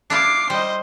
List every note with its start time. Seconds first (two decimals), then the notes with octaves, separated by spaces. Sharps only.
0.10 D4 E4 F4 D6 C7
0.50 G3 C5 D#5